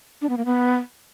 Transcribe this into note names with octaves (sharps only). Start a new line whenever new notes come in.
D4
B3
A#3
B3